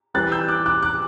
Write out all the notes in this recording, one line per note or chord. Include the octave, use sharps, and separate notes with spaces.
E3 G3 C4 F#6 A6
E6 G6
D6 F#6
D6 F#6
D6 F#6